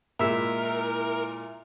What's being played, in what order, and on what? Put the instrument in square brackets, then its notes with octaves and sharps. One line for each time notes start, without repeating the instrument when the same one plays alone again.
[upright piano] A#2 G#3 [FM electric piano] E4 E5 [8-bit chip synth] A#4